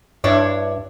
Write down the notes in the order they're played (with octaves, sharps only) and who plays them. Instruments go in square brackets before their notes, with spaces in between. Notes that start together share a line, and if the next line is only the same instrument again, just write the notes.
[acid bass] G2 [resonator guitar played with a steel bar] D4 E4 C#5